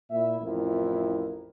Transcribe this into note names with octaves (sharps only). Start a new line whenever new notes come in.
A#2 E4 E5
A1 F2 E4 F4 A#4